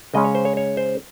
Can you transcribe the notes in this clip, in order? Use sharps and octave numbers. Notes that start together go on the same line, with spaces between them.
C#3 G#3 C#4 D#5
C#5
C5
C#5
C#5
C5